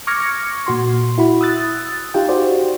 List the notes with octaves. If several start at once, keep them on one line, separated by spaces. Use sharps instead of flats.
C#6 D6 F6 G#6 A#6 C#7
A#2 F#4 C6
E4 F#4 B5
D#6 E6 F#6 A6
D#4 F4 G4 G5
F#4 G4 C5 D5